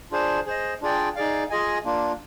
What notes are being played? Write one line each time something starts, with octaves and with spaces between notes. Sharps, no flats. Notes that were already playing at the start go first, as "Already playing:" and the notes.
D4 F4 G#4 C5
G#4 C5 D#5
D4 F4 G#4 D5 G5
D#4 G#4 D5 F5
F4 G#4 D#5 G#5
A#3 D4 F4